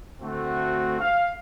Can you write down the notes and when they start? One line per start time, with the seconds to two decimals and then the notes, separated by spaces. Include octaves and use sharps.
0.21 D2 A3 C4 F#4
0.99 F5